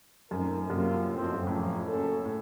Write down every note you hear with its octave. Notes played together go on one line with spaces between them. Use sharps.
F#2 A#2 A3 C4 D#4 A#4
F#2 C3 F#3 A#3 F4
A2 F#3 C4
F2
F#2
A2 C#3 F3 A#3
C#3 F#3 A#3 C#4 A4
A2